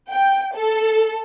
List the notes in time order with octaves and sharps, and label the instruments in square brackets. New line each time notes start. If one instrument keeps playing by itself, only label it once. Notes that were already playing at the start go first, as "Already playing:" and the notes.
[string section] G5
A4